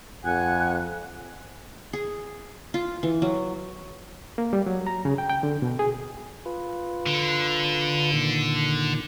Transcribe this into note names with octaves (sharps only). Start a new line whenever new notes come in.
F2 F#5 G#5 F#6
G#4
F4
E3
F#3
A#3
G3
F#3
A#5
C#3
G5
G5
D3
B2
G#4
F4 B4
D3
A#2 D#3